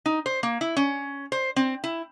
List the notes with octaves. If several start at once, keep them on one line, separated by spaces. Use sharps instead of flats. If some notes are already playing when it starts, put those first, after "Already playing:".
D#4
C5
A#3
E4
C#4
C5
C4
E4